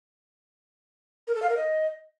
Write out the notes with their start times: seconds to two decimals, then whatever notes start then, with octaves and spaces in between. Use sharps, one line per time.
1.28 A#4
1.35 A4
1.42 F5
1.50 A#4
1.57 D#5